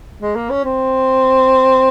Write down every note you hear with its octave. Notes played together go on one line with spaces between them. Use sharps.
G#3
A#3
C#4
C4